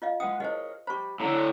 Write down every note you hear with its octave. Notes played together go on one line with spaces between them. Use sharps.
F4 D#5 F5
G#3 B4 F#5 D#6
G#4 A#4 C5 C#5 D#5
G4 C5 B5 C#6
A2 D3 A#5